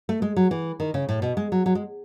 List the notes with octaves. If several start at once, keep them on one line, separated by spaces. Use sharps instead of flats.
A3
G#3
F#3
E3
D#3
C#3
A2
B2
G#3
F#3
F#3
G#3